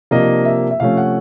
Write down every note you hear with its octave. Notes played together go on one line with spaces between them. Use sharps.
C3 F3 A#3 D4 D#5
E5
E5
C3 F3 A3 C#4 F5
F#5